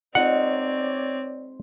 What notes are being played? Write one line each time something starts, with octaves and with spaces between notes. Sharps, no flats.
G#3 C4 D#4 F4 C#5 D5 F#5